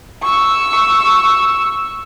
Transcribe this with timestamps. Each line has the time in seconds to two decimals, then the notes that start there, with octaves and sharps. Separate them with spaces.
0.22 C#6 E6